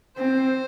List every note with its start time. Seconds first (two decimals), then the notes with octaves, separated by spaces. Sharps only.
0.17 C4 C5